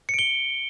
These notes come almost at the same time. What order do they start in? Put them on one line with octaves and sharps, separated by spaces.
C#7 D7 G7